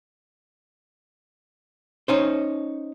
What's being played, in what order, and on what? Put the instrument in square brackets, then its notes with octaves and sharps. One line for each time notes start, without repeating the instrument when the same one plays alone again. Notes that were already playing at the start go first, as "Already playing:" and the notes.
[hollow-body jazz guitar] C#4 D#4 C5